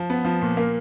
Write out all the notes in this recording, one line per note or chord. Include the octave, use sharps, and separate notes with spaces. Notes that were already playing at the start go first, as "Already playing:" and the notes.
Already playing: F3
B3
F3
A#2
A#3